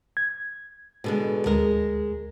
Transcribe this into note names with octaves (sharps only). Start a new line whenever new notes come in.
G#6
B2 D3 G#3
D2 G#3 A#4